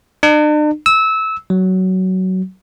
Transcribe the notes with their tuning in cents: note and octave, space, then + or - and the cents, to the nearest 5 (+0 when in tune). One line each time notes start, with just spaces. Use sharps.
D4 +45
E6 -20
F#3 +15